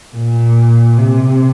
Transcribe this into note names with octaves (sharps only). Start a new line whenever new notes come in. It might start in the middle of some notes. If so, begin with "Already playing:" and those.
A#2
C3